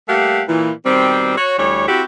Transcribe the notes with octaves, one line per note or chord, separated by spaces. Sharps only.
G3 A3 A#3 G4 F5 F#5
A#2 E3
B2 D#3 G3 C4
F#4 C#5
D2 E3 G3 C#5
C4 E4 F#4 G4